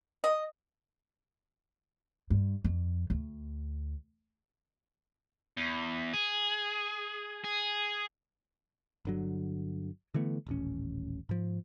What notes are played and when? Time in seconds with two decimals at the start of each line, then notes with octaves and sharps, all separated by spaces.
0.24 D#5
2.30 G2
2.64 F2
3.10 D2
5.57 E2
6.14 G#4
7.44 G#4
9.05 G1 D3 F#3
10.14 D3 E3 A3 B3
10.47 D#1 A1 C#4
11.29 G#2 F3